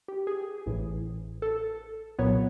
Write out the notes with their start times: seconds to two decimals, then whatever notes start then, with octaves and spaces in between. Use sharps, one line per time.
0.08 G4
0.27 G#4
0.66 A1 A2 E3
1.42 A4
2.19 C2 A#2 F#3 B3 C#5